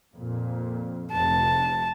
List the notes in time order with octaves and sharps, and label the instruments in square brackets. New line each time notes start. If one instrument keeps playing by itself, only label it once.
[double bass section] F2 A#2
[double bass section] F1 [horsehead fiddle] A5